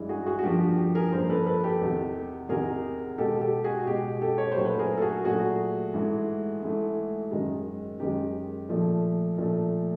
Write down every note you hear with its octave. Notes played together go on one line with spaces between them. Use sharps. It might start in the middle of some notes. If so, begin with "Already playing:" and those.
Already playing: G2 E3 G#3
F#4 G#4
F#4 G#4
F#4
G2 D3 F3 A#3 G4
F#4
G4
G#4 A#4
G2 D3 F3 A#3 A#4 C5
A4 B4
A4 B4
G4 A4
E2 C3 D#3
E2 C3 D#3 G#4 A#4
B2 G#3 G4 A4
G4 A4
F#4 G#4
B2 G#3 G4
G4 A4
C#5
A#2 F#3 A3 C5
B4
G#4 A#4
A4
F#4 G#4
A#2 F#3 A3 F#4 G#4
G#2 E3 A3
G#2 E3 A3
F#2 D#3 G#3
F#2 D#3 G#3 G4
A#2 F3 A3
A#2 F3 A3